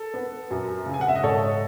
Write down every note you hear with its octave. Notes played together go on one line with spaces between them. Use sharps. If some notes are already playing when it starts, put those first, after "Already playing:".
Already playing: A4
B3
F#2
C#3
G#5
F#5
E5
D#5
G#2 A4 C#5